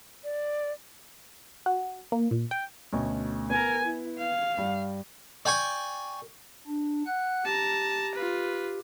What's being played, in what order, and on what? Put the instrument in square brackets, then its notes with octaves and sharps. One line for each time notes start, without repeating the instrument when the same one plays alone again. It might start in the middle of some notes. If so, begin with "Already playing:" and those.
[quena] D5
[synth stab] F#4
A#3
A#2
G5
[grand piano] D2 B2 C#4
[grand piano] B3 [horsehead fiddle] A#4 G#5
[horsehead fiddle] E4
F5
[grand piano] G2 G3
[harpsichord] D5 G5 G#5 C#6
[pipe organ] D4
F#5 F#6
[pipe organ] G4 [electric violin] A5 A#5
[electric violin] F4 B4